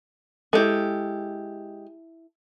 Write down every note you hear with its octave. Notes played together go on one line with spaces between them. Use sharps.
G#3 E4 G4 A4